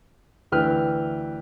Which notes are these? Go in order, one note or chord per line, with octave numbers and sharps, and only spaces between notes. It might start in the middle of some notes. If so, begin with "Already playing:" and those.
D2 E3 B4 G5 F6